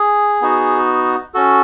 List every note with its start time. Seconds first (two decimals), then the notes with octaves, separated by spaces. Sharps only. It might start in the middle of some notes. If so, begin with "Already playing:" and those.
Already playing: G#4
0.42 B3 D#4 F#4
1.34 C#4 F#4 A4